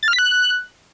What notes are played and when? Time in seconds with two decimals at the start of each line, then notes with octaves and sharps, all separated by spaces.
0.03 A6
0.08 F6
0.13 B6
0.18 F#6